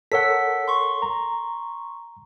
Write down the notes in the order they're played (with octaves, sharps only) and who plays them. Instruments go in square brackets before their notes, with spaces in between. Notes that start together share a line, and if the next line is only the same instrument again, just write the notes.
[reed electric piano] A4 A#4 C#5 [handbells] F#5 E6 B6
[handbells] C6 C#6
[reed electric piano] A#5